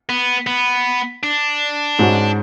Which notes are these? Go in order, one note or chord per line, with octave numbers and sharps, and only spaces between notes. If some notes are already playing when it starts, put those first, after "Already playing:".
B3
B3
D4
G#2 G#3 C#4 F#4